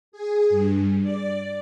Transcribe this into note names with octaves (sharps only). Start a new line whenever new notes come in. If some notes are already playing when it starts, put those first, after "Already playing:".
G#4
G2
D5